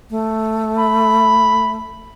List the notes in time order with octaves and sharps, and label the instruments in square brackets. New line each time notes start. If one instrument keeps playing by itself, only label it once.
[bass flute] A3
[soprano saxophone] B5